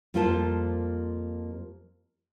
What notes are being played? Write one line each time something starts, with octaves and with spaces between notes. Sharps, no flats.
F2 G3 A#3 F4 C5 A5